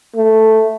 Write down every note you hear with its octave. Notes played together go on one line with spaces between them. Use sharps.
A3